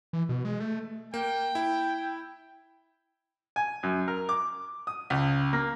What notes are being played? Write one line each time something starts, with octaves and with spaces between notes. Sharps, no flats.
E3
B2
G#3
A3
A#3 G5
E4
G#5
F#2
A#4
D6
D#6
C#2
A#3